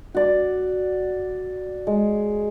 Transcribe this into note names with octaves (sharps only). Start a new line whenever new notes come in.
F#4 D5
G#3